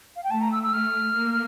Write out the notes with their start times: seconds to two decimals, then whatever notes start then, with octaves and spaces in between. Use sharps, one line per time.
0.16 F5
0.24 G5
0.31 A3 A5
0.41 A#5
0.52 E6
0.63 E6
0.73 A3 F6
1.16 A#3